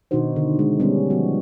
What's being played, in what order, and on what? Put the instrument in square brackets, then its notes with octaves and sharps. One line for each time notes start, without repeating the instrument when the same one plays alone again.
[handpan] B2 D#3 D4 D#4 F#4 C5
D3
G#3
G3 G#3 B3 C#4
F3 B3 F#4